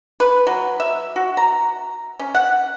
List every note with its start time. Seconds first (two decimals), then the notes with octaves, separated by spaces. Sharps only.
0.20 B4
0.47 F#3
0.80 E5
1.16 F#4
1.37 A#5
2.19 C#4
2.35 F#5